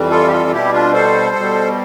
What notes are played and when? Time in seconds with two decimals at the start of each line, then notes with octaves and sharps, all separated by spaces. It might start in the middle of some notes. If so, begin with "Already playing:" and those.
Already playing: F2 E3 G3
0.10 F4 A4
0.27 G4
0.31 F4 A4
0.46 F4
0.52 B2 G3 E4 G4
0.73 D4 F4
0.94 A4 C5
1.36 B2 G3